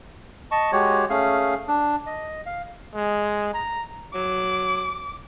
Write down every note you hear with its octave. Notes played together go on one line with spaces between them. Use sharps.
D#5 A5 C#6
G#3 F#4 G4 C#5
A3 C#4 G#4 F5
D4
D#5
F5
G#3
A#5
F#3 D6